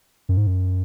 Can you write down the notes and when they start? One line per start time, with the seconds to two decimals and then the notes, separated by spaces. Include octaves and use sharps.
0.29 F#2
0.37 G#2
0.47 F#2